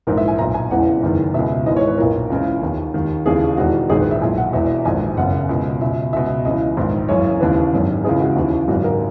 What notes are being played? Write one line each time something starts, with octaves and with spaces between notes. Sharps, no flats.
A#1 G#2 E3 A#4
E5
G#5
B1 A#2 A#5
G#5
E1 E2 C#3 E3 F#5
F#1 E2 D#3
C#2 B2 E5
G#1 G#2 E3 D#5
C#5
B4
B1 A#2 A#4
C#2 C#3 E3
D#2 D#3
D#2 D#3
D#2 C#3 E3 G#4
E1 E2 D#3 F#4
A#1 G#2 D#3 G#4
B4
E5
B1 A#2 G#5
F#5
E1 E2 B2 E5
A#1 G#2 D#3 G#5
F#1 F#2 C#3 F#5
C#2 B2
C#2 B2 E5
C#2 B2 E5
C#2 C#3 E3 D#5
A#1 G#2 D#3
F#1 F#2 C#3 E3 C#5
D#2 C#3 E3 B4
G#1 F#2 D#3
C#2 C#3 E3 G#4
F#4
D#2 C#3 E3
G#1 F#2 C#3 F#4
A#4